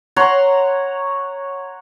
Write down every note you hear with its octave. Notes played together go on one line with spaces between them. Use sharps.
C#5 F#5 A#5 C6